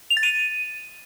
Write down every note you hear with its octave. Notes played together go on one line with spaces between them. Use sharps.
F7
A6
D#7